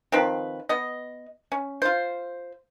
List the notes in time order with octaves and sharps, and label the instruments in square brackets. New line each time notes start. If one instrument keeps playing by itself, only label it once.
[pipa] D#3 F3 C4 B4
B3 D#5
C#4
F4 C5